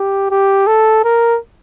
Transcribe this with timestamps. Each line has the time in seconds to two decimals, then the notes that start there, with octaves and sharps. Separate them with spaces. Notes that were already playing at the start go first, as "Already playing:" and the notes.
Already playing: G4
0.31 G4
0.67 A4
1.04 A#4